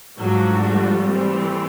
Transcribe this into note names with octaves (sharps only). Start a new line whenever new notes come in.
G#2 F3 F#3 A3 D4 F#4
G3
E3 A3 C4